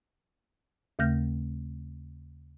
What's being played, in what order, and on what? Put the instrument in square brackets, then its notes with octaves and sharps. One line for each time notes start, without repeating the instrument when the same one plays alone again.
[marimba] D#2 C#3 A3 F6 G6 A#6